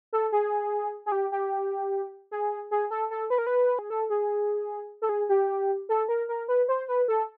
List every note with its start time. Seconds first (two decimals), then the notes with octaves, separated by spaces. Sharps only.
0.13 A4
0.32 G#4
1.06 G#4
1.12 G4
1.32 G4
2.31 G#4
2.71 G#4
2.91 A4
3.11 A4
3.30 B4
3.38 A#4
3.47 B4
3.79 G#4
3.90 A4
4.10 G#4
5.02 A4
5.09 G#4
5.29 G4
5.89 A4
6.09 A#4
6.29 A#4
6.48 B4
6.68 C5
6.88 B4
7.08 A4